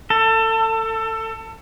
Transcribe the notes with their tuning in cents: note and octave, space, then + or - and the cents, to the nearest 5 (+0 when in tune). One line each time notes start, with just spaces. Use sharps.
A4 +25